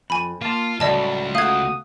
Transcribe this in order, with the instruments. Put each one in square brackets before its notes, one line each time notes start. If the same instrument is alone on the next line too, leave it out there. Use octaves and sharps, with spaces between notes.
[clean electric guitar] F2 [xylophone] G#5 B5
[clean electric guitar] A#3 A5 [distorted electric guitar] F4
[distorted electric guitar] C#2 [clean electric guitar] A2 F#3 [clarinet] G3 [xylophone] D5 D#5 A5
[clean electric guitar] A3 F#4 [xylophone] F5 G#6 [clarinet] D#6